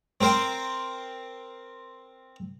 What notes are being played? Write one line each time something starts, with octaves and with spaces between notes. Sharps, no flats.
C4 A#4 C5 G5